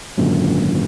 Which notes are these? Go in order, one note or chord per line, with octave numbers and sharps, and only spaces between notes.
G#1 F#2 A#2 D3